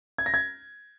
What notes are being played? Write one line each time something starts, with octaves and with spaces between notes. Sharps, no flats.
G#6
A#6
G#6